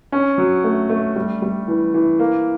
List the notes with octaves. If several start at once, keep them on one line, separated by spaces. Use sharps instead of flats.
C#4
F#3
A3
A3
G3
G3
E3
E3
A#3